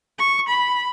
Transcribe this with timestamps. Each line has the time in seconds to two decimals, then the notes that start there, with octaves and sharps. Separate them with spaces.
0.19 C#6
0.49 B5